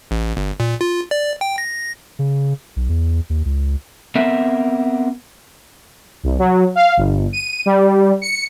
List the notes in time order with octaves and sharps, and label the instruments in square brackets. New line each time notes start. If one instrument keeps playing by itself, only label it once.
[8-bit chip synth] A1
G1
A#2
F4
D5
G5
A#6
[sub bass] C#3
B1
E2
D#2
C#2
[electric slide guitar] B3 C4 A#4 E5
[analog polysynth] C2
F#3
F5
G1
D#7
G3
C#7